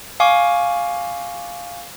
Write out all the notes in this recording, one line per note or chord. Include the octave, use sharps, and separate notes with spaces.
F5 G#5 C#6 D6